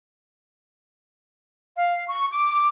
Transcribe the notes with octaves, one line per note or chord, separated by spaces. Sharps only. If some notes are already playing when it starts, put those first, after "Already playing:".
F5
C#6
D6